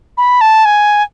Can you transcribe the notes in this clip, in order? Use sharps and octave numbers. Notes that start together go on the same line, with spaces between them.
B5
A5
G#5